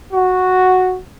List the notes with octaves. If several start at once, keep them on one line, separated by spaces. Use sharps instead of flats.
F#4